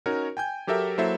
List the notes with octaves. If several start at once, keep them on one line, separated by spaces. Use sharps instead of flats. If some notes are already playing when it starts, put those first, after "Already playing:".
C#4 D#4 F#4 A#4 C#5
G5 G#5 G6
F#3 G4 A4 A#4 E5 G5
F#3 A#3 E4 A4 C5 E5